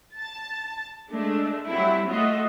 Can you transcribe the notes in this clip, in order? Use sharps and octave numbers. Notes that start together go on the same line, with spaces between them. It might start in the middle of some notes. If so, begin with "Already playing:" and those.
A5 A6
G#3 A3 D4
F#3 G3 C4 E4
A3 F4 F#4 D#5 E5